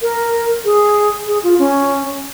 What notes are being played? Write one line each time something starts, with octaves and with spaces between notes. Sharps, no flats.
A#4
G#4
G#4
F4
C#4